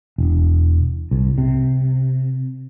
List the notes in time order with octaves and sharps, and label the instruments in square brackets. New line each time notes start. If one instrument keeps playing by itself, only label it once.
[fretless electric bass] E1
C2
C3